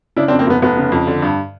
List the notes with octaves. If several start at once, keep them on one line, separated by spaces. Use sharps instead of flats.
C#3 D4 E4
C4 D4
F2
A#3 C4
F1 B3
F1 B3
C#3
F2
D3
G2